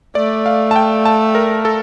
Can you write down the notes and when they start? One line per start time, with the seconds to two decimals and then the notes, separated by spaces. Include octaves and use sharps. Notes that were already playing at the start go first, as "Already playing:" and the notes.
0.15 A3 D5
0.46 F5
0.71 A5
0.76 G5
1.05 A5
1.35 A#4
1.65 A4